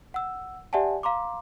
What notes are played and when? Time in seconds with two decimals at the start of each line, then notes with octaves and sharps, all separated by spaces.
0.14 F#5 E6
0.73 G4 D5 E5 F#5 G#5 A5
1.03 F5 A#5 C6 D6